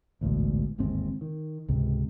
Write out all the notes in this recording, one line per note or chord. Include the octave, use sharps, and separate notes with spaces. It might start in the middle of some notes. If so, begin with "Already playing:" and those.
A1 D2 G#2 B2
G1 D#2 G#2 C4
D#3
C#2 G#2 C3